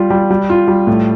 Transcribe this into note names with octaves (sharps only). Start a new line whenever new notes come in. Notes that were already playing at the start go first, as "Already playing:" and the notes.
Already playing: G3 F4
G3
G3
F4
G3
A2